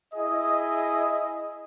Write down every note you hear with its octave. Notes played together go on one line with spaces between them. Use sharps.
E4 G#4 D#5